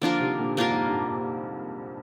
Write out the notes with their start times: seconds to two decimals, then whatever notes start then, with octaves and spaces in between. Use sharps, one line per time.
0.01 D3 F3 A#3 D4 F4 A#4
0.20 C3 D#3
0.39 A#2 D3
0.57 G#2 C3 A#3 D4 F4 A#4
0.70 F2 G#2
0.85 G2